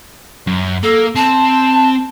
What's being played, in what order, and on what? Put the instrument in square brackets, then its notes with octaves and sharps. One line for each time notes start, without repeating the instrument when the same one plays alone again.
[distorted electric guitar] F#2
[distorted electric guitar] A#3 [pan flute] A4
[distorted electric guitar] C4 [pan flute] A5